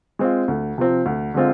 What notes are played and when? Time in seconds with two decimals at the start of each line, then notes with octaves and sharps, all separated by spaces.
0.19 G#3 C4 F4
0.48 D2
0.78 C3 F3 C4
1.06 D2
1.34 D3 G#3 C4 F4